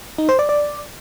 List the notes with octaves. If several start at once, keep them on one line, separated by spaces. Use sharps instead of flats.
D#4
C5
D5
D5